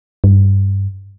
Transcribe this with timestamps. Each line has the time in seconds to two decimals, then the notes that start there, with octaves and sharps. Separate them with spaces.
0.24 G2